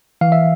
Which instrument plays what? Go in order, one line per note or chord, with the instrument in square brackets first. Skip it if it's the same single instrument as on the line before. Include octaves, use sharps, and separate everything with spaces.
[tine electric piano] E3 F5
E5